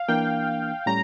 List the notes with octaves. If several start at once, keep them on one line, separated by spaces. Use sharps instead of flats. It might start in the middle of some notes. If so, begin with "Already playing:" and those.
Already playing: F5
E3 A#3 D4 G5
A2 G3 C#4 A#5